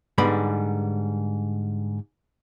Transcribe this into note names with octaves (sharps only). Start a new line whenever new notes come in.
G#2 D3 G3 B3 B5